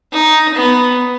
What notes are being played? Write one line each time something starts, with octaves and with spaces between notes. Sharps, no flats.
D#4
B3